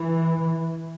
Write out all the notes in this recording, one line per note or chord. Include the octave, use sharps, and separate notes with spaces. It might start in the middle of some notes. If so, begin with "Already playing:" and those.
Already playing: E3